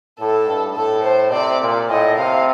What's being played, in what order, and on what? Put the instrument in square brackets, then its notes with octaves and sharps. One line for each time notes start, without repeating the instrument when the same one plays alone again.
[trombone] A2 [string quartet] A4
[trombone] G2
[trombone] A2 [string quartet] A4
[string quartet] C5
[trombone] C3 [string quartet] D5
[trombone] A#2
[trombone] A2 [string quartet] D#5
[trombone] C3 [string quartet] F5